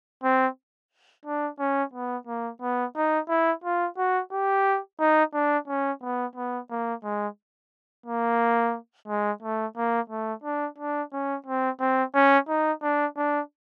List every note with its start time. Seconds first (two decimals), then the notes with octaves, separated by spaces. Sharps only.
0.23 C4
1.25 D4
1.59 C#4
1.93 B3
2.27 A#3
2.61 B3
2.96 D#4
3.29 E4
3.64 F4
3.97 F#4
4.31 G4
5.00 D#4
5.34 D4
5.68 C#4
6.02 B3
6.35 B3
6.70 A#3
7.03 G#3
8.06 A#3
9.08 G#3
9.42 A3
9.76 A#3
10.09 A3
10.43 D4
10.78 D4
11.12 C#4
11.46 C4
11.80 C4
12.14 C#4
12.48 D#4
12.82 D4
13.16 D4